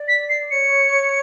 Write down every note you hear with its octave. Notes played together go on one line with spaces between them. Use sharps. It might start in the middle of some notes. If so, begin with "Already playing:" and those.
Already playing: D5
B6
C7
C#5 C#7